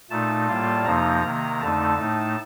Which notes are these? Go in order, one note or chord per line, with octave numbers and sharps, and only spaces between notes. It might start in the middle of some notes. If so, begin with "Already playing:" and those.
A#2 A3 D#4 A5
A2 G3 A#3 F4
F2 C3 F3 A#3 D#4 A#5
C3 D#3 A#3
F2 D3 A3 D#4 A5
A2 A3 D#4